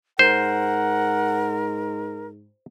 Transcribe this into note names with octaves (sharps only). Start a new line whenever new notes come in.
G#2 A#4 C5 F#5